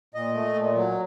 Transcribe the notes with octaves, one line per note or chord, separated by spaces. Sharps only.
A#2 D#5
A3
A#2
F#3